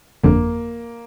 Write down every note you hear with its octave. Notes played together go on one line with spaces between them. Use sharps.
G1 F2 D3 A#3